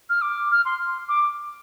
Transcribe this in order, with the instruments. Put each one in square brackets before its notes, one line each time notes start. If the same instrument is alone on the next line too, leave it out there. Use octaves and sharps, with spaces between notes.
[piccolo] F6
D6
F6
C6
D6